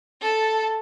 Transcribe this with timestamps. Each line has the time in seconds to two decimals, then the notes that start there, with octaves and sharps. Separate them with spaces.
0.21 A4 A5